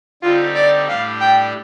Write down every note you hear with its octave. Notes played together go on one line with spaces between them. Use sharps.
D3 G3 C4 D#4 F4 G4
D5
A2 G3 D4 G4 F5
G5